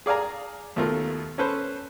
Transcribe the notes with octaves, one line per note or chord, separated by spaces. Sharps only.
G#4 D5 F5 G#5 A#5
D#2 B2 A3 F4 A#4
C#4 A4 B4 C5